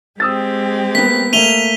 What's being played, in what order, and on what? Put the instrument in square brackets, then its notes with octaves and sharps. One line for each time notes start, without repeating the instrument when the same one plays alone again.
[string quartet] G#3 C4 G4 [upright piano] D#6 E6 A6
[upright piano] A#3 B3 [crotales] B6
[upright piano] A3 A#3 [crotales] D#7 F7 G7